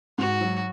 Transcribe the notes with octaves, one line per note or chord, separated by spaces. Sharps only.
G#2 F#4
F#3